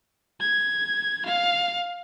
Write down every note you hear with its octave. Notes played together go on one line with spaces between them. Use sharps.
G#6
F5